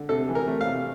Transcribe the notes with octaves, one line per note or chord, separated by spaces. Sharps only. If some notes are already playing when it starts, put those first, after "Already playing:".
Already playing: D3
C3 A4
E3
A#4
A3
F5
C3